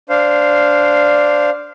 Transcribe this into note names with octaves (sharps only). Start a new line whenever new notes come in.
D4 C5 F5